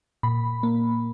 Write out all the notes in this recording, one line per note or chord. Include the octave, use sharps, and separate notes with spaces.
A#2 B5
A#3